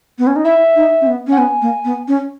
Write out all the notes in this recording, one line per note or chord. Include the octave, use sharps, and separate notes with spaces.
B3
C#4
D#4
E4 E5
D#4
C#4
B3
C#4
F#5
B3 G#5
A#3
B3
C#4